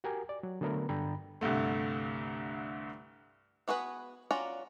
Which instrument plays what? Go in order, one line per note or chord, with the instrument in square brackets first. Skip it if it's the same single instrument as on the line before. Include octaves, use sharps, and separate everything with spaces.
[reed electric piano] F#4 G4 A#4 G#5
D5
F#3
D3 F#3 A3 B3 A#4 B4
G2 D3 A4 G5 A#5 B5
[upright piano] C2 G2 D3 A3
[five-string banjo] B3 F#4 G#4 B4
C#4 F4 F#4 D5 A#5